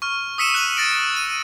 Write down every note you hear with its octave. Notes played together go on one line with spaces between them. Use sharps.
C#6 F6
D#6 E6 B6 C#7 D#7 E7
F#6 F#7
A6 A#6 D7
D#7